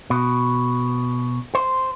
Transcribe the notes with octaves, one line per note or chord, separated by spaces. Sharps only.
B2
C5